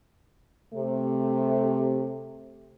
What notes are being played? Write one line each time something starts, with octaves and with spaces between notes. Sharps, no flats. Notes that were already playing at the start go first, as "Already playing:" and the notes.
C3 A3